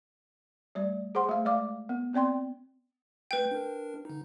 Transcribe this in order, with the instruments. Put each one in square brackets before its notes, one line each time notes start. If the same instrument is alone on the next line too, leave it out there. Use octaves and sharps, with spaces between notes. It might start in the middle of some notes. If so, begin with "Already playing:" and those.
[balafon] G3 A3 D5
G#4 C5 F#5 C6
A3 F5
G#3 D5 F5 D6
B3
B3 C4 D5 G5 C6
[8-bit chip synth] A3 G6 [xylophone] B4 G5
[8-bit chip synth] D4 A#4
D3 D#4